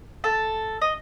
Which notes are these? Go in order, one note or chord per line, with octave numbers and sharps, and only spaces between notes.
A4
D#5